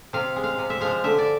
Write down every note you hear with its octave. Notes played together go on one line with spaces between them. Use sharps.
C3 F5
G#3
F5
C3
E5
F3 G#3 F5
D3 E5
D5